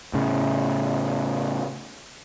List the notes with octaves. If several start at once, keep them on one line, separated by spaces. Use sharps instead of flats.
A2 C#3